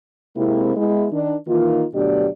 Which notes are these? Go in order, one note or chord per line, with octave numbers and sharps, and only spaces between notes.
C3 G#3 A#3 C4 E4
G#3 B3 E4
D#3 D4
D#3 E3 A#3 D#4 F4
D2 B2 F#3 D4 G4 D5